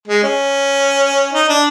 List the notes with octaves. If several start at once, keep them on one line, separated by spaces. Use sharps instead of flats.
G#3
C#4
D#4
D4